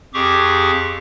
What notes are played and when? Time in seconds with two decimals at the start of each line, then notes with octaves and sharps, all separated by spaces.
0.14 F2 G4 G#4 C#6 D6